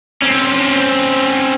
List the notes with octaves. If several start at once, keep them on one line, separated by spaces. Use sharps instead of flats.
C4 C#4